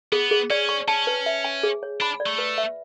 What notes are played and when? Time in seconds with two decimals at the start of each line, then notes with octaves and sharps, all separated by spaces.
0.12 B3 G#4
0.31 G#4
0.50 C#4 D5
0.69 C#6
0.88 C#4 A5
1.07 B4
1.26 E5
1.44 G#5
1.63 G#4
1.83 C#5
2.01 D4 B5
2.20 D5
2.26 A3
2.38 B4
2.58 E5